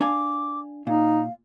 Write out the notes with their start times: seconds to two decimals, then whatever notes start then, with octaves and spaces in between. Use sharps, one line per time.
0.01 D4 F5 G#5 D6
0.87 A#2 D#4 F5